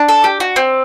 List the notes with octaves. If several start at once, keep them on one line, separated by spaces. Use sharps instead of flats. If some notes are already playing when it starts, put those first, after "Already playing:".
Already playing: D4
A4
G4
F#4
C4